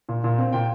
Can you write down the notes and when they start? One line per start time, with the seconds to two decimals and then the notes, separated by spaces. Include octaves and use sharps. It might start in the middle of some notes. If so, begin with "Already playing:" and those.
0.09 A#2
0.24 A#2
0.38 C4
0.52 A#2 G5